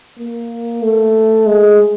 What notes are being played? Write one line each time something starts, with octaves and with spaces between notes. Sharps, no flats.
A#3
A3
G#3